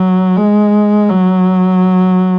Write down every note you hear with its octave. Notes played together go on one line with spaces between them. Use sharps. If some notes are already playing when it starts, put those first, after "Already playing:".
Already playing: F#3
G#3
F#3